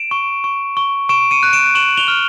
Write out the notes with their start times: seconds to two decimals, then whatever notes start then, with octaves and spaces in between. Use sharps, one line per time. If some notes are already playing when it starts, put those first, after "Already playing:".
Already playing: D7 E7
0.11 C#6
0.44 C#6
0.77 C#6
1.09 C#6 D7 E7
1.31 C#7 D#7
1.43 F#6
1.53 D7 E7
1.75 C#6 E7 F#7
1.97 F7 G7
2.08 F6